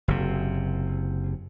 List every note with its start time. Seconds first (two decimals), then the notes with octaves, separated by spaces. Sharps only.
0.08 F#1 C3